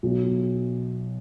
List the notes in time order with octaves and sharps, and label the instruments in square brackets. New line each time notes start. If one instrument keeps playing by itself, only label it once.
[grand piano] B1